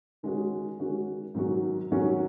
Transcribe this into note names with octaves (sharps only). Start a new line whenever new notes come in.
D#3 G#3 C#4 F#4 A#4
D#3 G#3 C#4 F#4 A#4
G#2 D#3 F#3 C#4 F#4
G#2 D#3 F#3 C#4 F#4